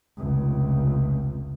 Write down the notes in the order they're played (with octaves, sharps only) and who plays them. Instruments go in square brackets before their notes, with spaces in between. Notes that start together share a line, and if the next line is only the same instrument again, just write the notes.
[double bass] F1 C#2